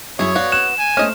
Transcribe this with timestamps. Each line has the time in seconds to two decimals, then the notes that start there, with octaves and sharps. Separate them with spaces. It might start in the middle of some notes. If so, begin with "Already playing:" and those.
0.19 F#2 E4 G#4 C#5
0.35 B3 F#4 D5 F5
0.52 F#6 E7
0.79 G#5
0.97 A3 C#4 C5 D#5 F6